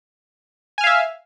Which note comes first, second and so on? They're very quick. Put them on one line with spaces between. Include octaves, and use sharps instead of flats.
G#5 F6 F5 E5